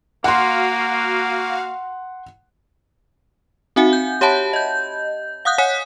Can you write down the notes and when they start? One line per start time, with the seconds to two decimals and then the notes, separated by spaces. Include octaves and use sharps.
0.24 A#3 F#4 F5 F#5 C6
3.76 C4 D#4 F#4 E5 F#5 G#5
3.93 G6
4.21 G4 C#5 E5 F#5 A5 B5
4.53 D#5 G6
5.45 F5 F#5 D#6 F#6 G6
5.58 C#5 F#5 G#5 D#6 B6